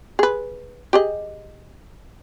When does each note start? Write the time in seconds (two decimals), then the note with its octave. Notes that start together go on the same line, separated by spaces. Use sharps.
0.19 G#4 B4
0.93 G4 G#4 D#5